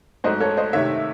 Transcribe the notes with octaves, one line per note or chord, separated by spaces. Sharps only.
G#2 F#3 A3 C5 D#5
A4 C#5
C5 D#5
C3 D#3 A3 C#5 E5